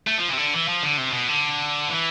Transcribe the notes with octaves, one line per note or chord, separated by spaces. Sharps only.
A3
F3
E3
C3
D3
E3
F3
D3
C3
B2
D3
E3